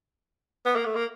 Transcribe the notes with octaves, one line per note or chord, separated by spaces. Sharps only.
B3
A#3
A3
A#3